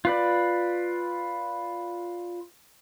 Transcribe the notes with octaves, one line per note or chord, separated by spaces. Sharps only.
F4 B4 D5